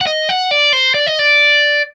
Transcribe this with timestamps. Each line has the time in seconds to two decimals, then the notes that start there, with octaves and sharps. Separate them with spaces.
0.01 F#5
0.07 D#5
0.29 F#5
0.51 D5
0.73 C5
0.94 D5
1.07 D#5
1.19 D5